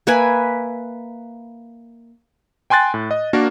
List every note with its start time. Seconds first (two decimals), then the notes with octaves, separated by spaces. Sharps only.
0.07 A#3 B4 E5 G#5
2.70 G5 G#5 C6 F#6 A6
2.94 A2
3.11 D#5
3.33 A#3 D4 F#4 A#4